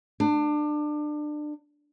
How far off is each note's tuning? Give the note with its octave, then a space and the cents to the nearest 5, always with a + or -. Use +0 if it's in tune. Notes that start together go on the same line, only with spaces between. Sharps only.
D4 +25